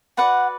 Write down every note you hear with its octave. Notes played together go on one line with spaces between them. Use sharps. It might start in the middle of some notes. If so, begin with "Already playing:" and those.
F#4 B4 D5 F#5